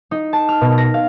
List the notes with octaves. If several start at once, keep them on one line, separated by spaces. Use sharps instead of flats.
D#4
A5
F6
B2
A#6
F5